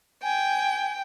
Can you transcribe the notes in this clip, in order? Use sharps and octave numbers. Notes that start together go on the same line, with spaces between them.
G5 G#5